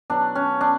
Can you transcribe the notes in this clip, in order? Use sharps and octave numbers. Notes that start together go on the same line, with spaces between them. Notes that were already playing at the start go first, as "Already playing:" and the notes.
B2 F#3 D4
C#4
D4